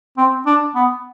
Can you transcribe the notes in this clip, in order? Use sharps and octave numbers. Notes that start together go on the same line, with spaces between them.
C4
D4
B3